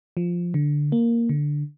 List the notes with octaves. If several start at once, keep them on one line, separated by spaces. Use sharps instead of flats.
F3
D3
A#3
D3